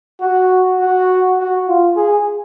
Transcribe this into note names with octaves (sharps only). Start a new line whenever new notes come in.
F#4
F#4
F#4
F4
G#4